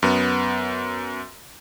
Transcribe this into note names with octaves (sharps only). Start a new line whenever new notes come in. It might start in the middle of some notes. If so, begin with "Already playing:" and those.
F#2 B3